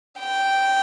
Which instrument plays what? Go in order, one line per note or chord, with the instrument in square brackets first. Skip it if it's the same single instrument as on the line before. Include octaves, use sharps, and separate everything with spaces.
[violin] G5